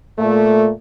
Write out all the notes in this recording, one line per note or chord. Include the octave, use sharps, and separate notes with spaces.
A#2 A3